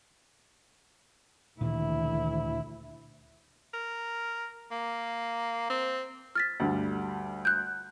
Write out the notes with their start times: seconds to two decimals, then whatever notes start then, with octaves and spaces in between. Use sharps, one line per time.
1.61 D2 A#2 D#3 E3 E4
3.74 A#4
4.71 A#3
5.70 C4
6.35 F6 A6 B6
6.60 D2 G2 D3
7.45 F#6 G6